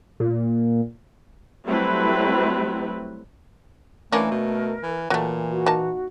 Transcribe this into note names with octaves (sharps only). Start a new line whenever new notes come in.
A#2
F#3 G3 A3 C4 E4 B4
E3 A3 A#3 C#4 D4 A#4
B2
E3
A#2 E3 F#3 A3
F#4
A#3 D#4 A5